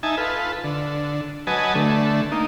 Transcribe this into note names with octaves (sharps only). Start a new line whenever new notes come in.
D#4 E5 G#5 A5
F4 A4 B4
D3
F#3 B4 D#5 G#5 A5
D3 A3
A#3 D#4